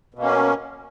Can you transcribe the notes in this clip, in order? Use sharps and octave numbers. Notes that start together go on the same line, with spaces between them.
B2 A#3 C#4